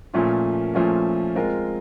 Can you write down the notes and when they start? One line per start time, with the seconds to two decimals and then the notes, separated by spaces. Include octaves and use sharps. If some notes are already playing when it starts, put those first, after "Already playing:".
0.14 A#2 F3 A3 C#4 F4
0.74 A#2 F3 A3 C#4 F4
1.35 G#3 C4 F4 A#4